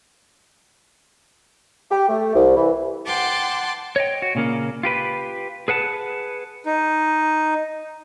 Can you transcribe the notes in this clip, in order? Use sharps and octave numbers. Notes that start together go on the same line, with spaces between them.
G4
A3
C2
E3
F#5 G5 A5 C6 D6
C#5 D#5 G5
F#4
A#2 C#3 A#3
F4 G4 B4
G#4 B4 F#5 A5
D#4